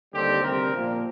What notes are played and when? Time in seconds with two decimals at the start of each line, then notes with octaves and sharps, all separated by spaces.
0.12 D#2 D3 G3 C4 G4
0.42 D2 C3 G3 C4 A#4
0.73 A#2 F3 A#3